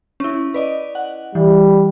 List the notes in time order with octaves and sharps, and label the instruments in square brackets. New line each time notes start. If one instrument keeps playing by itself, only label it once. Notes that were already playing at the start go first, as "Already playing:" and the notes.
[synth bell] C#4 E4
B4 D5 D#5
F#5
[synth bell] E3 [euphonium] G3